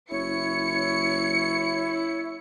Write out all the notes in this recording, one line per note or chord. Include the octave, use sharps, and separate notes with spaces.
F#1 E4 C#5 C#7